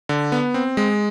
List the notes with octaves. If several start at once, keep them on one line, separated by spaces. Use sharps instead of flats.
D3
B3
C4
G#3